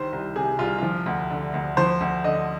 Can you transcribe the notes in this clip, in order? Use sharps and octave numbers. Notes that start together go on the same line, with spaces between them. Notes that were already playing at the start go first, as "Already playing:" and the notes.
Already playing: C2 D#3 C5
C2
C3 G#4
C2 F4
F3 F4
D2
D3
D2
F3 C5
D2
D3 D#5